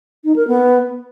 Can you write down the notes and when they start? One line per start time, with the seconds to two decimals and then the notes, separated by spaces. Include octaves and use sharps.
0.25 D#4
0.36 A#4
0.48 B3